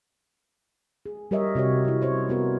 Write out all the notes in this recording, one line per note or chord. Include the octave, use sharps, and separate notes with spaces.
G#4
G3 G4 A#4 C#5 D#5 E5
C3 F#4 G4 C#5
G3 E4
C#4 C5 C#5
B3 F#4 A#4